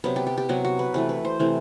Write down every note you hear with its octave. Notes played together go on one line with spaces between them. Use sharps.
C3 F#3 B3 B4
G4
G4
G4
C3 F#3 B3 F#4
F#4
B4
C3 E3 A3 B4
B4
C5
C3 E3 A3